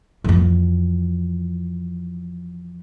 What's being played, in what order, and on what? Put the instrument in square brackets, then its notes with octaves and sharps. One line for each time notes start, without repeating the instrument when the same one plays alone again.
[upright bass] F2 E3